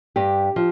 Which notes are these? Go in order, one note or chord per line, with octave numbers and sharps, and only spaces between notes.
G2 G4
F3